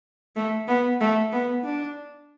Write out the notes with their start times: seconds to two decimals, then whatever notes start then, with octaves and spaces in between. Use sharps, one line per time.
0.36 A3
0.68 B3
1.01 A3
1.32 B3
1.64 D4